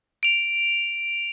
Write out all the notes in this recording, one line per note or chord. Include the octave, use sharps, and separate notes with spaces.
D7 F7